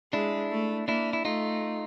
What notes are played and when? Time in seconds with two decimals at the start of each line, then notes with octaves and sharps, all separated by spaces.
0.13 G#3 D4 E4
0.51 A3
0.88 A#3 D4 E4
1.13 E4
1.25 A3 D#4 F4